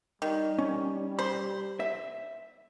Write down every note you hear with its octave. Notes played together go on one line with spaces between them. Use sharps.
D#3 G3
C#4
C5 B5
E5